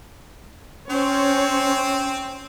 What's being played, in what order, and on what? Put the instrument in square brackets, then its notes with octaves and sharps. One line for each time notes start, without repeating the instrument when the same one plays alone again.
[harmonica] C4 [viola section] C#4 C5 C#5